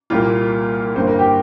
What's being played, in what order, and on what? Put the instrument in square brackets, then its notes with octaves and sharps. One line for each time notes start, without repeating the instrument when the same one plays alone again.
[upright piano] C2 A#2 G3 A#3 F4
G1 G2 G3 A#3 C5
A#4
G4